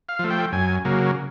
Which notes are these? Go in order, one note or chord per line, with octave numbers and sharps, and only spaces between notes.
F5
F3 A3
G5
F#2 G#5
C#3 F#3 A#3